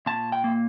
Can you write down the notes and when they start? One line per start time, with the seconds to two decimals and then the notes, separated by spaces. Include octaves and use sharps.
0.06 A#2 A5
0.32 G5
0.44 A#3